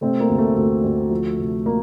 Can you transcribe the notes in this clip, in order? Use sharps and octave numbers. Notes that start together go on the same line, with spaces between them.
C3 A3 C4
A#3
D2
A3
D2
D2
F3
C3
A#3